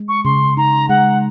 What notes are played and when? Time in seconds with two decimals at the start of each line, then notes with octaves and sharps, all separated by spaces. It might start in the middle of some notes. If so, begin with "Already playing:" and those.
Already playing: G#3
0.08 C#6
0.25 C#3 C6
0.57 D#4 A#5
0.89 G#3 F#5